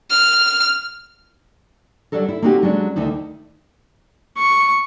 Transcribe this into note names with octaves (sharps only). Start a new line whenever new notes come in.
F6
F#3 G3 D4 A4 A#4
E4
A#3 C4 C#4 D#4 F#4 G4
F#3 G#3 C#4 D4
D2 D#3 D#4 E4
C#6